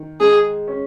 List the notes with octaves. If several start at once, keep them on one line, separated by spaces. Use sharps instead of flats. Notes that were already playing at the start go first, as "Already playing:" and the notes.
Already playing: D#3
G#3 G#4
C#4